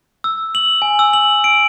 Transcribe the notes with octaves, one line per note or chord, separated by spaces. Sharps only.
E6
F#7
G#5
E6
F#7
D7